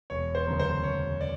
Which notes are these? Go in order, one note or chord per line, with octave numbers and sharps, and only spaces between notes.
E1 C#5
C5
D2 C#3 F#3 A#3
C5
E1 C#5
D5